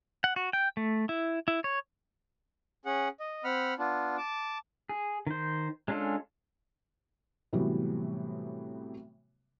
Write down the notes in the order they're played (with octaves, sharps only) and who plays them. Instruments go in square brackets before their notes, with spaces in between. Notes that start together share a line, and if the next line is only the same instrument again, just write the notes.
[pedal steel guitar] F#5
F#4
G5
A3
E4
E4
C#5
[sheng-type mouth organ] C#4 G#4 F#5
D#5
C4 F#5 B5 F6
B3 D4 F4
A5 D6
[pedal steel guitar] G#4
D#3 C5
G#3 C#4 D4 F4 A4
[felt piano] A2 C3 E3 F#3 G3 B3